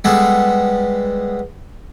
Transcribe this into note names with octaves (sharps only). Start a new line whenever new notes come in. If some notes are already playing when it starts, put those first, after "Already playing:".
G3 G#3 B3 G#4 A4